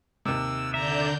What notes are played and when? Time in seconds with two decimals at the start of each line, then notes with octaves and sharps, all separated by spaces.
0.25 D#2 C3 E6
0.74 D3 D4 E5 A#5 G6